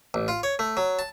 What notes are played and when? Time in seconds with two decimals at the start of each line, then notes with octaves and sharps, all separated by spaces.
0.14 A1
0.28 F4
0.43 C#5
0.59 A3
0.77 F#3
0.99 A5